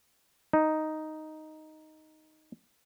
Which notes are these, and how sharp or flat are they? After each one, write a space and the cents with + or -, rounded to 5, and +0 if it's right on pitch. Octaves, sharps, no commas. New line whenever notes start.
D#4 +0